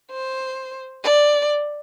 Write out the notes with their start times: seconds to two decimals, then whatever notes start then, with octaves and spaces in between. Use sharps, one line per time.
0.11 C5
1.03 D5